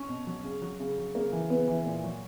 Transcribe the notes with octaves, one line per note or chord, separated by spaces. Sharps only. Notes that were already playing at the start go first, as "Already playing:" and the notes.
Already playing: C#4
B2
F#3
C#3
F#3
C#3
F#3
C#3 A#3
E3
C#3 B3
E3
A#2
F#3